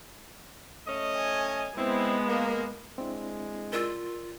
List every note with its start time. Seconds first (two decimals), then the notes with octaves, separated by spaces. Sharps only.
0.87 A3 C#4 D#5
1.16 G#5
1.77 G#3 B3 C4 E4
2.27 A#3
2.98 G#3 C4 D4 E4
3.73 F4 A#4 D5 E6